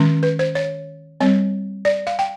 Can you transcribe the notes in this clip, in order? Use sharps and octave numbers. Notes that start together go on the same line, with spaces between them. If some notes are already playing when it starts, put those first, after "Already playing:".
Already playing: D#3 G#3 C#4
B4
C5
C#5
G3 C4 C#5
D5
F5
G5